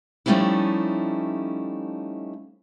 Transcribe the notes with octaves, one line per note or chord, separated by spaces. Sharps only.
F3 G3 A3 C#4 D#4 E4